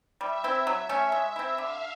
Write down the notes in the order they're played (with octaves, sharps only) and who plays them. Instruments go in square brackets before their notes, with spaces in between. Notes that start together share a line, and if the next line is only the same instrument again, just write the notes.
[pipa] G3 [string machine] E5
[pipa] C4 E4
[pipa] F#3 [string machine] E5
[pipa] A3 C#4
G#3
C4 E4
[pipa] D3 [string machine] F5